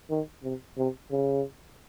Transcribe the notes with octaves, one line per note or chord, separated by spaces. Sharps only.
D#3
C3
C3
C#3